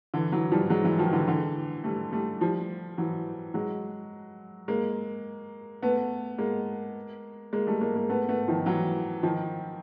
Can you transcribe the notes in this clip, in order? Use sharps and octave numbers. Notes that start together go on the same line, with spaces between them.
D3 E3
E3 F#3
F3 G3
F#3 G#3
E3 F#3
D#3 F3
D3 E3
D3 E3
G3 A3
G3 A3
F3 G3
E3 F#3
F#3 G#3
G#3 A#3
A3 B3
G#3 A#3
G#3 A#3
G3 A3
G#3 A#3
G#3 A#3
A3 B3
A3 B3
D#3 F3
E3 F#3
D#3 F3